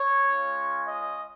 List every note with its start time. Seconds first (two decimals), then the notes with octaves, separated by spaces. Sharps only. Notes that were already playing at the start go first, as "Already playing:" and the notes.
Already playing: C#5
0.23 G#3 C#4 F4
0.88 D#5